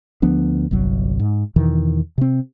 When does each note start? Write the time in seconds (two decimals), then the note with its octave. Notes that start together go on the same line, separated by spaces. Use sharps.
0.22 D2 F3 B3 D4
0.71 G1 C2 F#3
1.19 G#2
1.56 E2 B2 D#3 E3
2.18 C3 C4